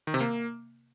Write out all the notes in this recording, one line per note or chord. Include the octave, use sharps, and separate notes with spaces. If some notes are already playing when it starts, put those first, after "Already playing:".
D#3
C3
A#3